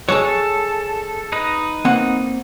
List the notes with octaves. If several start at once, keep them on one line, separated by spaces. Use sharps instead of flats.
F#3 G#3 G#4 A4 C#5
A4
D#4 B4 D#5
A#3 C4 F#5